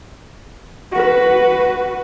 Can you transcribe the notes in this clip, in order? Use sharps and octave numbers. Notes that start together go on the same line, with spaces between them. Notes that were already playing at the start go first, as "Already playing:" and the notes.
F#4 B4